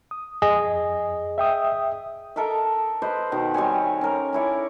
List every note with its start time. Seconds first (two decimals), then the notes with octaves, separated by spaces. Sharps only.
0.11 D#6
0.42 F2 G#4 D#5
1.38 E5 G5 D#6
2.36 A4 A#4 D#5 E5
3.02 B4 C5 D#5
3.32 B2 D#3
3.54 G3 C4 C#5 G#5
4.01 C#4 A#4
4.33 C#4 E4 C#5 D5